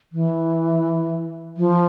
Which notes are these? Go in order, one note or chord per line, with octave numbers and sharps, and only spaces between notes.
E3
F3